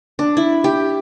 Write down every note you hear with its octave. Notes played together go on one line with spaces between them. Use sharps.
D4
E4
G4